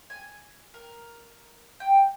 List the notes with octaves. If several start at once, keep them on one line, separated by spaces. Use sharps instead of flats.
G#5
A#4
G5